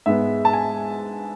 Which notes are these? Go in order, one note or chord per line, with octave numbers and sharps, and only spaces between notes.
G#2 G#3 B3 E5
A5
G#5